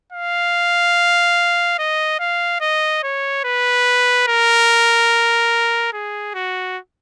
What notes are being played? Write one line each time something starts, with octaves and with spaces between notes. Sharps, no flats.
F5
D#5
F5
D#5
C#5
B4
A#4
G#4
F#4